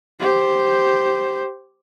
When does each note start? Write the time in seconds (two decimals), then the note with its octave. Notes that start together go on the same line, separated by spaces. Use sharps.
0.20 G4 C5